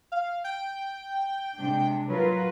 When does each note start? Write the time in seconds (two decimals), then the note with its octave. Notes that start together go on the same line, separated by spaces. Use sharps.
0.12 F5
0.44 G5
1.57 C3 G#3 D4
2.10 F#3 F4 A#4 B4